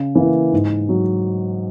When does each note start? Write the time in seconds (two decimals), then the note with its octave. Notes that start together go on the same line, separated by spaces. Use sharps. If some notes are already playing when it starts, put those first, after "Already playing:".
Already playing: C#3
0.15 E3 A#3 E4
0.52 G#2
0.89 F#3